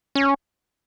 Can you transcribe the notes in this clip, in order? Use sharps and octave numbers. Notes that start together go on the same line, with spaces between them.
C#4